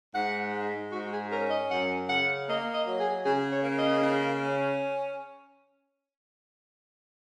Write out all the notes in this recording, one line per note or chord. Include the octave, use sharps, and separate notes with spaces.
G#2 F#5
G#3
G#2 F#4
G#4
C#4 A#4
D#5
F#2 F#5
C#3 F#5
A#3 D#5
D#5
F#3
G#4
C#3 G#4
C#5
A#3
D#5
C#3
C#4